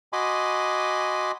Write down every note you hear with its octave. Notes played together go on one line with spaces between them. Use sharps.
F#4 D#5 G#5 B5 C6 D6